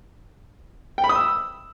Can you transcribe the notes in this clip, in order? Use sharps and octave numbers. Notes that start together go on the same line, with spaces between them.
G5
B5
D#6
E6